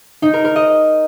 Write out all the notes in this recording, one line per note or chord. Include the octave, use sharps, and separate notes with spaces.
D#4
A#4
A#4
D#5